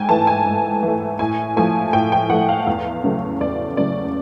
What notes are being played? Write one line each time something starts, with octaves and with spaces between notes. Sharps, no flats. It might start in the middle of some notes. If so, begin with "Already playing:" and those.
Already playing: G#2 G5 G#5
E3 A3 A5
G#5
G#2
E3
A3
A2 G#5
F3 A3 G#5
A2 G5
G5
F3 A3 F#5
F5
E2
C#3 F#3 A3
E2 D5
C#3 F#3 A3 D5